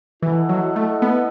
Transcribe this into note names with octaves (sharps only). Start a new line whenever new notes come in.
E3 E4 A4 D#5 F#5
F#3
A3
B3